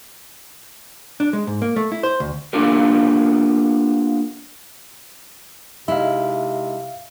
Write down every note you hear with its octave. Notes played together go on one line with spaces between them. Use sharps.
D4
G#3
G#2
A#3
A3
E4
C5
D2
A#3 B3 D4 F4 G4 A#4
C3 G#3 D#4 E4 E5 F5